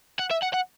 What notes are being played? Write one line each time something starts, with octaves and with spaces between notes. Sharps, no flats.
F#5
E5
F#5
F#5